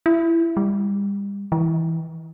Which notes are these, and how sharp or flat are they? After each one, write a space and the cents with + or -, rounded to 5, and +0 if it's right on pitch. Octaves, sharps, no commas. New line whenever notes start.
E4 +15
G3 +35
E3 -15